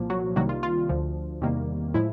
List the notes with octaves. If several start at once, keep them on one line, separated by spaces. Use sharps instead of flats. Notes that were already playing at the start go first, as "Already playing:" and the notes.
Already playing: C2 A#2 F3 A#3
F#3 F#4
C2 C3 D#3 F#3 G3 A#3 F#4
F4
F4
D2 D3 F3
E2 C3 D#3 G3 A#3
A2 F3 G#3 E4